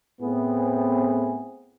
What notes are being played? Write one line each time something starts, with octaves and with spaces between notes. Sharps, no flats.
A2 B3 C4 E4 G#4